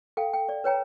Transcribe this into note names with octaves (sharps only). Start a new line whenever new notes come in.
A4 F5 G5
G5
D5
B4 C#5 G5 A#5